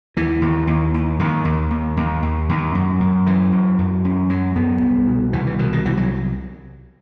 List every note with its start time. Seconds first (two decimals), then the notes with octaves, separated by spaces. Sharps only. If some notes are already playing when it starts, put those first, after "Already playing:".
0.17 D#2 E3
0.42 D#2
0.67 D#2
0.94 D#2
1.19 D#2 D#3
1.45 D#2
1.71 D#2
1.97 D#2
2.23 D#2
2.49 D#2
2.75 F#2
3.00 F#2
3.26 F#2 E3
3.52 F#2
3.78 F#2
4.05 F#2
4.29 F#2 F#3
4.55 F#2 B3
4.81 C2
5.07 B2
5.33 C2 E3
5.47 E3
5.59 B2 D#3
5.73 D#3
5.85 C2 E3
5.97 F#3